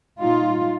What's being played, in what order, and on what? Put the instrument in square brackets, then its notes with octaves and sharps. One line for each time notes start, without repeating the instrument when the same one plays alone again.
[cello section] A#2 G3 D#4 F4